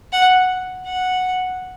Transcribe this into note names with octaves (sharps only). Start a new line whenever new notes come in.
F#5
F#5